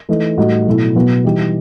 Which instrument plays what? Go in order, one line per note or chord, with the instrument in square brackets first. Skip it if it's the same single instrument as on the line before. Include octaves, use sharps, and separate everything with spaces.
[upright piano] E3 A3 D#4
A2 G3 D#4 F#4
B2 F#3 A3 E4
B2 F#3 B3 F#4
E3 G3 D#4 G4